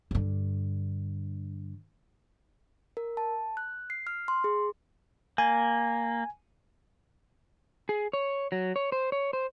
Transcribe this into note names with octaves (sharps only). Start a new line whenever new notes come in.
G2 D3
A#4
A5
F#6
C7
F6
C6
G#4
A#3 G#5
G#4
C#5
F#3
C#5
C5
C#5
C5